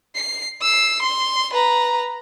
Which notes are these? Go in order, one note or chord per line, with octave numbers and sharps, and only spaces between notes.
C7
E6 C7
C6
B4 A#5